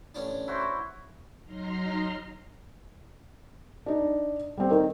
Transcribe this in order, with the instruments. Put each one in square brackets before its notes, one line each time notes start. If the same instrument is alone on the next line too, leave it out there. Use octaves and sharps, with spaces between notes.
[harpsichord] A1 C#4 D4
[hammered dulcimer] E4 F#4 C5
[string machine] F#3 D#4 A#5 C6 F6
[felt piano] D4 D#4
G3 C4
[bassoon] D#3 [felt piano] A#4